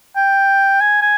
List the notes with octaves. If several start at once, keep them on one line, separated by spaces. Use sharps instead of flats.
G5
G#5
G#5